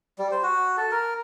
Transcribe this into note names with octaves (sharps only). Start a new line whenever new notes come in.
G3
C5
F#4
A4
A#4